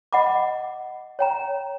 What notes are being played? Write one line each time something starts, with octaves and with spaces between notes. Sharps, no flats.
D#5 F#5 B5 D6
C#5 G5 A#5